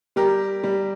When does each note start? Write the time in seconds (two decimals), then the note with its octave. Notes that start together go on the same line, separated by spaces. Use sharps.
0.16 G3 G4 A#4
0.63 G3